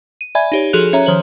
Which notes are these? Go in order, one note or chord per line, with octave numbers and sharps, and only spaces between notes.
D#7
D5 E5 G#5 B5 G#6
D#4 G4 C#5
F3 F#4 G#4 A4 F#6 F7
C#4 C#5 E5 A#5
D#3 F3 C5 C#5 F#7